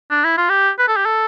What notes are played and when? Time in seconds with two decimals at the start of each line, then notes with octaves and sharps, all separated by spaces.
0.11 D4
0.24 E4
0.37 F4
0.49 G4
0.79 B4
0.88 A4
0.97 G4
1.06 A4